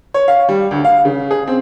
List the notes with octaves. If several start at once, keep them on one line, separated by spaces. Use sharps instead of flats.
C#5
F5
G3
D2
F5
C#3
G#4
C4